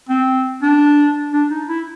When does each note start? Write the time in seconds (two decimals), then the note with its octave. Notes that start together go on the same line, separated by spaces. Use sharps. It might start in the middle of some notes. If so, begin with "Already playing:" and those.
0.09 C4
0.62 D4
1.33 D4
1.50 D#4
1.68 E4